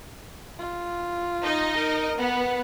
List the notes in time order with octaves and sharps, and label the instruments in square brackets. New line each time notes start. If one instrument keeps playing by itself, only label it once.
[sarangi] F4
[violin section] D#4 D#5
[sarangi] A#4
[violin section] B3 [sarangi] F#5